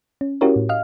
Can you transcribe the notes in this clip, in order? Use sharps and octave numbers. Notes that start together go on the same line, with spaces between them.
C#4
C#4 E4 F#4 G4 A#4 C#5
A2
D#5 F5 F6